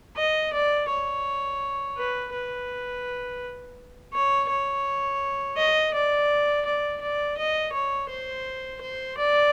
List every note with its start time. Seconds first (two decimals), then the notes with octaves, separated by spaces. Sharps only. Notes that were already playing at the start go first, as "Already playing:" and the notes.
0.17 D#5
0.53 D5
0.89 C#5
1.98 B4
2.33 B4
4.13 C#5
4.50 C#5
5.57 D#5
5.94 D5
6.65 D5
7.01 D5
7.38 D#5
7.73 C#5
8.09 C5
8.81 C5
9.18 D5